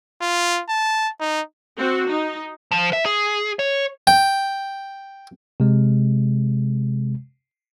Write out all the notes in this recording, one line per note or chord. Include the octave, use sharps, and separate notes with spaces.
F4
A5
D#4
C4 F#4
D#4
F3
E5
G#4
C#5
G5
C3 G#3